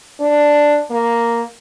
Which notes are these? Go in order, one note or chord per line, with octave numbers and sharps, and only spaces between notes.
D4
A#3